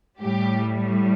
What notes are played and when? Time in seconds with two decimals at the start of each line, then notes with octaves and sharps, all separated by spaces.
0.21 A2 G3 G4